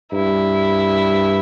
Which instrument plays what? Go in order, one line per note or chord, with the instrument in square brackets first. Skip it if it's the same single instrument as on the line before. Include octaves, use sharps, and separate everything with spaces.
[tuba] G2 [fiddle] E4